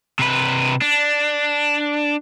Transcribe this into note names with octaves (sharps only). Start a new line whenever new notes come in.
C3 B4
D4